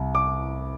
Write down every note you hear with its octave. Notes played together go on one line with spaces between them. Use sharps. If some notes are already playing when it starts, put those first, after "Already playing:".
Already playing: C2
D6